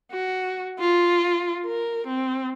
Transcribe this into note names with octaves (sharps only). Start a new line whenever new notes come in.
F#4
F4
A#4
C4